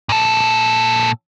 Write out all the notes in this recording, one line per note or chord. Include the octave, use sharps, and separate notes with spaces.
A#2 A4